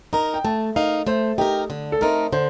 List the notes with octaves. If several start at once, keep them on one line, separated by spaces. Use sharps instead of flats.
D#4 A#4 A#5
G5
A3 A5
D#4 A#4 F5
A3 C5
D#4 G4 A#4
D3
A4
A3 C4 D#4 A#4
D3 C5